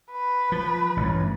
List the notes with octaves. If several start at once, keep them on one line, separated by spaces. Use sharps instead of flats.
B4
F3
A1 G2